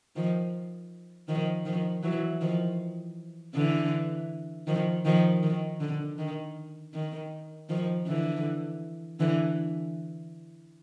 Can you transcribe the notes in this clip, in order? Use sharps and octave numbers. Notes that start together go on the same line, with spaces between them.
D#3 F3
D#3 F3
D#3 F3
E3 F#3
D#3 F3
D3 E3
D#3 F3
D#3 F3
D#3
D3
D#3
D#3
D#3 F3
D3 E3
D3 E3